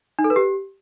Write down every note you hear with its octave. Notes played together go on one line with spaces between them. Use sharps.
D#4
A4
B4
G4